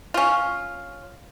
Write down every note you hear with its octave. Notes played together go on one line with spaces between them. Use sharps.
C#4 F4